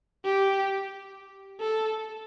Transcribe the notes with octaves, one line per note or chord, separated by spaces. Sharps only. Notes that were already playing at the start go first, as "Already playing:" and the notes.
G4
A4